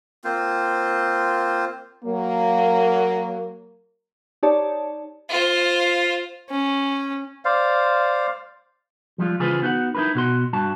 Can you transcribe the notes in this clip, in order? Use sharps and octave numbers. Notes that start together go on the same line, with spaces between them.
A#3 C4 F4 C5
F#3 A#3
D#4 G4 C#5 D5 A5
F4 C5
C#4
C5 D5 F5
F3 G3 G#3 F4
C#3 E3 F4 G#4 B4 C5
B3 D#4 F#4 F#5
D#4 E4 F#4 A#4 B4
B2 F#4 C6
G2 F#4 A5